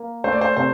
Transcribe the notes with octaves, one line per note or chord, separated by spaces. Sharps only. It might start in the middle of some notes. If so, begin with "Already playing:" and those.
Already playing: A#3
A3 C5
D5
C5
C3 C5